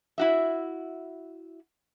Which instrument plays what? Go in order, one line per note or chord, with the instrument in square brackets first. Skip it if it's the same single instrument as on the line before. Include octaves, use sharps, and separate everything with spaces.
[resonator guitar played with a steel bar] E4 F#4 E5